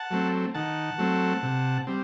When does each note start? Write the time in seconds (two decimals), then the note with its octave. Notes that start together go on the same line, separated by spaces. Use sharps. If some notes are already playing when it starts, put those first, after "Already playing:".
Already playing: F#5 A5
0.11 F#3 A3 C4
0.54 D#3 F#5 A5
0.98 F#3 A3 C4
1.43 C3
1.87 G3 C4